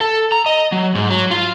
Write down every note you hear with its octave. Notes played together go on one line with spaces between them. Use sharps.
A4
A#5
D#5
F#3
G#2
F#3
F4